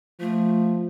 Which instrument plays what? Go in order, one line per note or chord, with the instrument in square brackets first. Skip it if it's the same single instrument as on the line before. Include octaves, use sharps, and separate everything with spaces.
[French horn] F3 [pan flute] A3